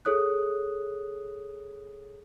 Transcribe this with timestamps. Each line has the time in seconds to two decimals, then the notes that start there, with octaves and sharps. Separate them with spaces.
0.05 G#4 A4 C#5 D#6 F#6